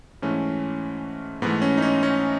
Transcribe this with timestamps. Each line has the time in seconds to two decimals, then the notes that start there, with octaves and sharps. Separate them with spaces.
0.22 G#2 E3 A3 C#4
1.42 G#2 E3 A3 B3
1.62 C#4
1.78 D#4
1.82 C#4
2.03 C#4